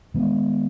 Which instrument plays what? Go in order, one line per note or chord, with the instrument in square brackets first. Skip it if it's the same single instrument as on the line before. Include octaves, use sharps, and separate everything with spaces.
[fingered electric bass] D#3 G#3 B3